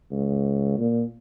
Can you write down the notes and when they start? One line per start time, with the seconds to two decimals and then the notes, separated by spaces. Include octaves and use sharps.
0.12 C#2
0.79 A#2